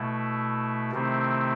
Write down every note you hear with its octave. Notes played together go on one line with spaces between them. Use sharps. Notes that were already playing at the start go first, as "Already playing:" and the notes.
Already playing: B2 A3 E4
C3 D#3 A3 C4 E4